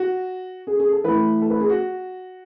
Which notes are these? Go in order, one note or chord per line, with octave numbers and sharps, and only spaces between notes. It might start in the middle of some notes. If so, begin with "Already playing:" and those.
Already playing: F#4
G#4
G#4
A4
A2 E3 B4
A4
B4
G#4
F#4